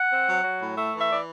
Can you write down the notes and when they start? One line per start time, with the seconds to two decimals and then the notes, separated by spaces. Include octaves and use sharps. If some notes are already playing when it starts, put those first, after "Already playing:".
Already playing: F#5
0.11 C4
0.27 F#3
0.43 F#3
0.59 A2
0.76 A3 E5
0.93 E3 E5
1.09 E3 D5